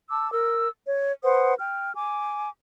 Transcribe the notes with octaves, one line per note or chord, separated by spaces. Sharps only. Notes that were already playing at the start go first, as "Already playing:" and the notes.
A5 D6 E6
A#4 E6
C#5
B4 C5 F#5 D#6
G5 F6
G#5 D6